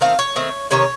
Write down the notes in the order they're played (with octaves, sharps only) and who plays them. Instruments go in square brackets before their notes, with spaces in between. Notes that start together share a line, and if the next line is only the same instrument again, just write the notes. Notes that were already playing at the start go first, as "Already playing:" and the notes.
[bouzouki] D#3 A3 C4 F5
C#5
D#3 A3 C4
C3 D#3 A3 C#4 C#5